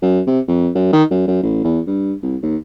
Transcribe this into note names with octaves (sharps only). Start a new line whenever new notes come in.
F#2
C3
F2
F#2
D#3
F#2
F#2
A1
E2
G2
C2
D#2